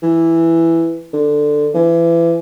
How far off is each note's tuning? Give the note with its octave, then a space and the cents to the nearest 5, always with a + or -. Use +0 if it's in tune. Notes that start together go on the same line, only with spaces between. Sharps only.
E3 +5
D3 +10
E3 +30